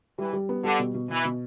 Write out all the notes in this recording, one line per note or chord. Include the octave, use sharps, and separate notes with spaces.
E3 G3
G3
B3
D3 G3
B2
B2
B2 E3
B2